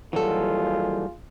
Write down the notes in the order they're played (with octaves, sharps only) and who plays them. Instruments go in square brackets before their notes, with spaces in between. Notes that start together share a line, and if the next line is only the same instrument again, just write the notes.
[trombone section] D#2 F4 G#4 [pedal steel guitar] E3 F#3 G3 [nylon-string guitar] F#4 A4